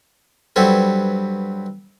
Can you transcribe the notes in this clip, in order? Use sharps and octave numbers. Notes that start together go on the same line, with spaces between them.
G2 F#3 C4 A4 B4 G#5